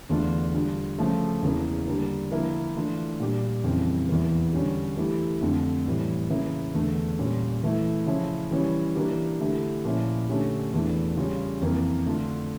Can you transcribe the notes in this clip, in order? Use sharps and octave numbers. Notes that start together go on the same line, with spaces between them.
E2 D3 A3 D4 F4
D3 G3 D4 F4
C#3 F3 A3
E2 C#3 E3 A#3
D3 G3 A#3 D4
D3 F3 A#3 E4
E3 A3 D4 F4
A#2 G3 D4 G4
F2 C#3 E3 G3
E2 E3 A#3
D3 G3 C#4 G4
E3 A3 E4 G4
F2 D3 A3
A2 E3 G3
C#3 E3 A#3 E4
E2 D3 A3
A#2 G3 C#4 F4
E3 A3 E4
C#3 F3 C#4 E4
E3 G3 C#4 E4
E3 A#3 D4 G4
D3 A3 E4 G4
A#2 F3 C#4 E4
D3 A3 C#4 G4
E2 E3 A3 D4
C#3 G3 C#4 F4
F2 E3 A#3
D3 A3 D4 F4